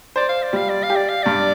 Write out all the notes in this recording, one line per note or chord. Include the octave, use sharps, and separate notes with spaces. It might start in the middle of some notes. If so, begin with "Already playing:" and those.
C5 D5
F5
D5
G3 F5
D5
F5
G4
D5
F5
G2 D5